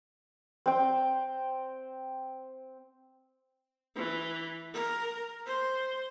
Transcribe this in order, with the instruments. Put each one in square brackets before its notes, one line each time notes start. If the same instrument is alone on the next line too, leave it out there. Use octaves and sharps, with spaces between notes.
[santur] C4 G5
[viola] E3
A#4
C5